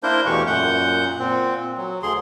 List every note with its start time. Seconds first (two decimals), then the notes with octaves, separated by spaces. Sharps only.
0.03 A#3 D4 E4 A#4 C5 G6
0.26 E2 B2 E3 A3 G4 C#6
0.47 F#2 A#2 F#5 G6
1.19 A#2 C4
1.78 F#3
2.03 D2 D3 G#4 C6